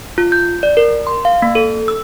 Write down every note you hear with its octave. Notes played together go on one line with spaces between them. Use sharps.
F4
G6
D5
A#4
C6
F5
A#3
A4
E6